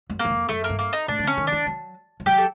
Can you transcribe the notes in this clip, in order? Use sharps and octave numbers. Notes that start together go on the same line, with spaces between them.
F#2
A#3
E2
F2
F#2 A3
A#3
G2
A#3
D#4
A2 D4
D#3
D3 C#4
D#3
D4
E3
F#3
F3
F#3 G4
A4